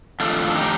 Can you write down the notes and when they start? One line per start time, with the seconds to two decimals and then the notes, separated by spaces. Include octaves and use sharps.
0.20 F2 D#3 A3 D4 F4 A4
0.50 A4
0.55 D#4 G4